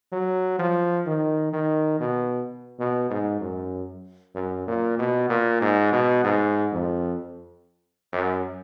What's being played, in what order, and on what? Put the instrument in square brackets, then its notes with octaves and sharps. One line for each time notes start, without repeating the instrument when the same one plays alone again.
[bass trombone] F#3
F3
D#3
D#3
B2
B2
G#2
F#2
F#2
A#2
B2
A#2
G#2
B2
G#2
F2
F#2